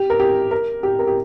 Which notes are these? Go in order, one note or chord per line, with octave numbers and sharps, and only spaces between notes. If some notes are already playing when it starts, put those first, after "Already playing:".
Already playing: G4
A#4
G4
A#4
G4
A#4
G4